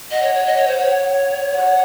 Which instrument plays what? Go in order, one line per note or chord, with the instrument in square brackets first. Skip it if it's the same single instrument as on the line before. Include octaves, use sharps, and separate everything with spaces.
[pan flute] D#5 [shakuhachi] F#5
[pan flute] C#5
C#5
D#5
C#5
C5
C#5
[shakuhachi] F#5